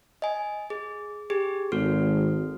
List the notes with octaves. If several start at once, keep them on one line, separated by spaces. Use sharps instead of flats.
D#5 G#5
G#4
G4 G#4
G#1 F#4 A4 F6